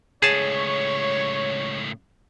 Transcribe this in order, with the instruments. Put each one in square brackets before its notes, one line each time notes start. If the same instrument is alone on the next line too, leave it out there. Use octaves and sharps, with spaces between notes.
[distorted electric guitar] C#2 A2 [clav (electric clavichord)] G#4 A5 [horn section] C#5